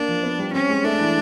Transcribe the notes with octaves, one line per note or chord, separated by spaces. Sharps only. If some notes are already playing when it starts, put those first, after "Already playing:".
Already playing: A#3 D4
F3
B3
G3
C4 C#4
G#3
A3 D4
E3